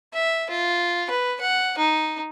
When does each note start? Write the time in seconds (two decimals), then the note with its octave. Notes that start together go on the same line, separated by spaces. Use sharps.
0.14 E5
0.50 F4
1.10 B4
1.41 F#5
1.78 D#4